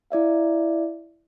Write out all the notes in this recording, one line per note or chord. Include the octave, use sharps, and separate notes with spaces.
E4 D5 E5 F5